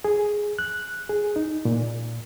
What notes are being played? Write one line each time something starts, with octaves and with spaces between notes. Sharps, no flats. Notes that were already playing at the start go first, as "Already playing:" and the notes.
G#4
F#6
G#4
D#4
A#2